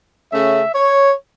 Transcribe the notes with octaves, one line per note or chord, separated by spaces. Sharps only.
C#3 A3 C#4 E5
C#5